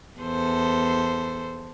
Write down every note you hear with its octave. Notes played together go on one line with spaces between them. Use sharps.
E2 A4 C5